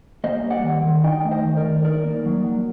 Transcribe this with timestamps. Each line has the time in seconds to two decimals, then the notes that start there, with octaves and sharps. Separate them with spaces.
0.24 A#3 C5 D#5
0.44 G3
0.50 D5 F#5
0.63 D#3
0.85 D#3
1.04 D#4 D#5 G5
1.25 A3
1.31 C5 D#5
1.45 D#3
1.57 A#4 D5
1.64 D#3
1.84 D#4 A#4 D5
2.04 A#3
2.25 F#3
2.45 F#3